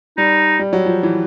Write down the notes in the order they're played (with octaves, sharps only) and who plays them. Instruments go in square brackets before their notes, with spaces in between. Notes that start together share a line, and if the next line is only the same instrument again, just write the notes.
[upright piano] G3 [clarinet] D#4
[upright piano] G3
F#3
F3
E3